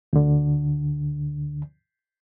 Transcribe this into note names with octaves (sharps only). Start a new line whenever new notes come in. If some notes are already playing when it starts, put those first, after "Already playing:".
D2 D3